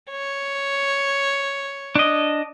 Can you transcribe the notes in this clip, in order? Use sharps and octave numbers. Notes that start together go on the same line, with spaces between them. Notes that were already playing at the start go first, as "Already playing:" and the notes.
C#5
D4 D#5